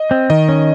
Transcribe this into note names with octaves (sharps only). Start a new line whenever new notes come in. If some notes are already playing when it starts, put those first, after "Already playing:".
Already playing: D#5
C4
D#3 D#5
C#4